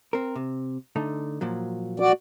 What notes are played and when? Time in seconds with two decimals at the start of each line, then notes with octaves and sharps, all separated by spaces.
0.13 C4 A#4
0.36 C3
0.96 D3 A3 D#4
1.41 A#2 F3 F#3
2.00 F#4 D5